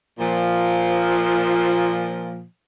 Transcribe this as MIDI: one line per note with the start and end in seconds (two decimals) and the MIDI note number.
0.19 2.43 46
0.19 2.43 53